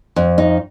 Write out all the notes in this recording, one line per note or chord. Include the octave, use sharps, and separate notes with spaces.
F2
D#4